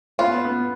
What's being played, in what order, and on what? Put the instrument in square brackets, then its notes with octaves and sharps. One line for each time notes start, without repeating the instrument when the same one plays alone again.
[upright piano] B3 [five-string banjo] F4
[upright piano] B3